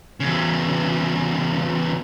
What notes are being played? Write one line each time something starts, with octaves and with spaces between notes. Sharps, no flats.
E2 C#3